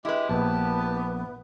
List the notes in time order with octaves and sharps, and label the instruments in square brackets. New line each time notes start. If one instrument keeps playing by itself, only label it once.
[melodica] G#3 G4 [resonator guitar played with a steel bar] E4 B4
[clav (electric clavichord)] A#1 [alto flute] B3 [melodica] G4 A5